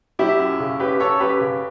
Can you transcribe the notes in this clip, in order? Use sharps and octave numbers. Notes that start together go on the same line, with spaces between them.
F#3 E4 G4
F#2
C#3
F#2 G4 B4
F#2 A4 C#5
F#2 G4 B4
C#3